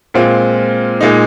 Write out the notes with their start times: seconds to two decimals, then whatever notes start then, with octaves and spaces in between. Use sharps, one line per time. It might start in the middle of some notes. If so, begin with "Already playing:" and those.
0.14 A#2 G#3 C4 F4
1.01 A#2 G#3 D#4